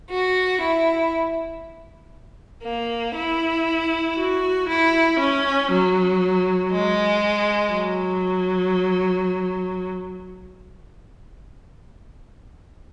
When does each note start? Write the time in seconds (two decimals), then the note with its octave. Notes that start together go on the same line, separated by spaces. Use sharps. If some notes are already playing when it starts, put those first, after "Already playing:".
0.10 F#4
0.61 E4
2.64 A#3
3.16 E4
4.17 F#4
4.68 E4
5.19 C#4
5.71 F#3
6.72 G#3
7.73 F#3